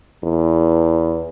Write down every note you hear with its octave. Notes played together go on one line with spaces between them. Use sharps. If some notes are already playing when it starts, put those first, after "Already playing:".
E2